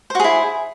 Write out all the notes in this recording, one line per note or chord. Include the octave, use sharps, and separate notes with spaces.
E4 F#4 G#4 C5